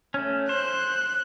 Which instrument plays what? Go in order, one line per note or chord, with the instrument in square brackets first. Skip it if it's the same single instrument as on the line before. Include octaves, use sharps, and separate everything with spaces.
[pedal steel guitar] A3 C#4
[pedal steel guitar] C5 [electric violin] F#6